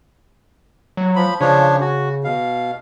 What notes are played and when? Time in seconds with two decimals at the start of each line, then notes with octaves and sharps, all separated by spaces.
0.97 F#3
1.16 F3 B5
1.41 C#3 F3 D4 C#5
1.81 F#4
2.24 B2 F5